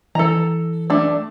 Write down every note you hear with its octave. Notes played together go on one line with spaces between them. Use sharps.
E3 A4 A#5
A3 D4